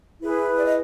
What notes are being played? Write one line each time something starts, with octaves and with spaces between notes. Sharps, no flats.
E4 G#4 B4
D5
D#5